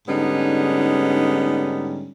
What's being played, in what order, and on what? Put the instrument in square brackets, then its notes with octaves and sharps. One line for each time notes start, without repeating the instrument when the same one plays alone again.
[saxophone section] G#2 D3 G3 B3 C#4 D#4